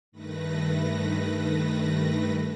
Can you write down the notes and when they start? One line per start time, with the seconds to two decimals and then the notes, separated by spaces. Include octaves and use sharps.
0.12 G2 D#3 A3 B4 A#6